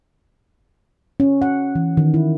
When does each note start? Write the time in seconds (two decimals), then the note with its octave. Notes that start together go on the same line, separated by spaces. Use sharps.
1.20 C#4
1.42 F#5
1.75 E3
1.97 D#3
2.14 E4